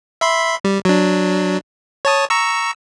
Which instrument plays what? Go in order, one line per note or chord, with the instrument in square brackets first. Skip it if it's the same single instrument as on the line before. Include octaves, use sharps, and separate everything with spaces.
[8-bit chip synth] E5 B5 C6
G3
F#3 D4
C#5 A5 D#6
A#5 C#6 E6